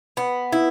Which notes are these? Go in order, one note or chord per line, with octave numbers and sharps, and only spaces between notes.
B3
E4